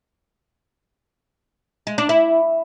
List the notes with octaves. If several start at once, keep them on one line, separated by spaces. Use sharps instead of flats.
G#3
D4
E4